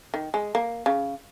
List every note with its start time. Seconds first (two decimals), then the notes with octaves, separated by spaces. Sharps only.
0.14 D#3
0.34 G#3
0.55 A#3
0.86 C#3